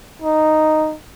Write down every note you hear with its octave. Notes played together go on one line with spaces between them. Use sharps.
D#4